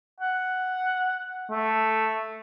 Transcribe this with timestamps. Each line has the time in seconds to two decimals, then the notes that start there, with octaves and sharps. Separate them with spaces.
0.20 F#5
1.50 A3